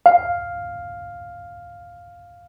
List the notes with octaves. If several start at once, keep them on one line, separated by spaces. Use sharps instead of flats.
F5